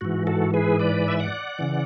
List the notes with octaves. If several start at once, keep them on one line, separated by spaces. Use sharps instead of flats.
G#2 E3 F#4
F#4 A4
G#4 B4
B4 D5
E5
D5 F#5
C#3 E3